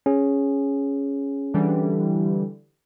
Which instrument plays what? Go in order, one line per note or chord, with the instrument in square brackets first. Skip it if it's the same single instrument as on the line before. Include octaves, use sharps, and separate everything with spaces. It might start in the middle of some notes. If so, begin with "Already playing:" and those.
[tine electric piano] C#4 G#4
[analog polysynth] D3 E3 G3